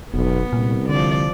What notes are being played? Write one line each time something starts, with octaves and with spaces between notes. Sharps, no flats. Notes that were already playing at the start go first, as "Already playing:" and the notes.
F1 B1 B3
C2 A#2
D3 F3 D5